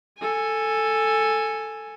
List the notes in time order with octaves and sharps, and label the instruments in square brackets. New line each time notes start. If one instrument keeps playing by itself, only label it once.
[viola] A4 G#5